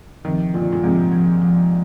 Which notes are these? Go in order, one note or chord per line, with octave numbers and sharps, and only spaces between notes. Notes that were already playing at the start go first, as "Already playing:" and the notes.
C3 D#3 F3
A#2 D3 F4
A#2
G#2 C3 F3
F3
F3